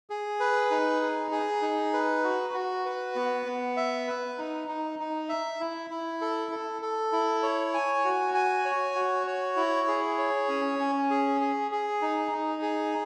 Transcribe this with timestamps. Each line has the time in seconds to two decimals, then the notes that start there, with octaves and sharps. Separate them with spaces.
0.10 G#4
0.40 B4
0.71 D#4
1.01 G#4
1.31 G#4
1.62 D#4
1.93 B4
2.24 F#4
2.54 F#4
2.85 B4
3.16 B3
3.46 B3
3.77 E5
4.07 B4
4.38 D#4
4.68 D#4
4.99 D#4
5.29 E5
5.60 E4
5.90 E4
6.21 A4
6.52 A4
6.82 A4
7.12 E4
7.43 C#5
7.74 G#5
8.05 F#4
8.34 G#5
8.65 C#5
8.95 F#4
9.27 C#5
9.56 E4
9.88 G#4
10.18 C#5
10.49 C#4
10.79 C#4
11.10 G#4
11.41 G#4
11.71 G#4
12.02 D#4
12.32 D#4
12.62 G#4